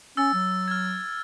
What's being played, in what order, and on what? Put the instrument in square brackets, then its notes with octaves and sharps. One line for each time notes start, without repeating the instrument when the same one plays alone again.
[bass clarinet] C#4 [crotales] E6 A6
[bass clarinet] F#3
[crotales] F6 G#6